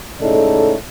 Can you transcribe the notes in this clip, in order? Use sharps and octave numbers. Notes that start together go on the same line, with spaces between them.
A2 C#3 G#3 D#4 A4 D5